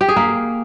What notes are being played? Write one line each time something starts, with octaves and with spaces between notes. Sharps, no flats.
G4
G#4
A#3